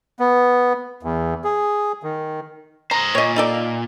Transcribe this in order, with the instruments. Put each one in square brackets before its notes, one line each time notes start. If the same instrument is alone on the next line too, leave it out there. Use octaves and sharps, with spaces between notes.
[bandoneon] B3
E2
G#4
D#3
[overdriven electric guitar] C5 D#5 [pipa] A#5
[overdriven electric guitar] A#2 [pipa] C#5 D#5
[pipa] D#4 A4 D5